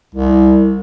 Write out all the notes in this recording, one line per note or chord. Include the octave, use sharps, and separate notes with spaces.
C2